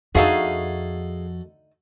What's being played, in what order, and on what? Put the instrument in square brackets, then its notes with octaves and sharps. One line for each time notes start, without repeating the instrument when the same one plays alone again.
[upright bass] F2 [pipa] D3 A3 D#4 [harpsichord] F#4 A4 [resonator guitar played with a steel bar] G#4 F5